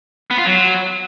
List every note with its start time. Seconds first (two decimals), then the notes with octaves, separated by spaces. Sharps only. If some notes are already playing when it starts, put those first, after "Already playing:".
0.31 B3
0.38 F4
0.45 F#3